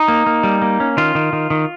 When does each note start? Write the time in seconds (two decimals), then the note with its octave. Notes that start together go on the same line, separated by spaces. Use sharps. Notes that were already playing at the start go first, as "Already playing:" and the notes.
Already playing: D#4
0.08 A#3
0.26 A#3
0.43 G3
0.62 A#3
0.80 C#4
0.97 D#3 F4
1.15 D#3
1.33 D#3
1.50 D#3